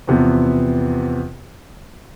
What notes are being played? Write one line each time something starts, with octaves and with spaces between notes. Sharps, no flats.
E2 C3 F3 B3